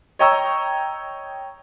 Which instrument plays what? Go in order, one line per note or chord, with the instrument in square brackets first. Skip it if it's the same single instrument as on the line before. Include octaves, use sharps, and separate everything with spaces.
[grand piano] C#5 D#5 G5 A#5 C#6 E6